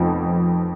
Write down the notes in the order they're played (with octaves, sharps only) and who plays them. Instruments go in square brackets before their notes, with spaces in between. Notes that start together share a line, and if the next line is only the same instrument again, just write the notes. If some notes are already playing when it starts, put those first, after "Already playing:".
Already playing: [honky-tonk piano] F1 F2 F3 B3 D#4